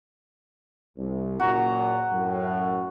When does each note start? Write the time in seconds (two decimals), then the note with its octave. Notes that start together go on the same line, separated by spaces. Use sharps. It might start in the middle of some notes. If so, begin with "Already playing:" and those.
0.97 C2
1.40 F#1 A#2 F#4 A#5
2.12 F#2 A2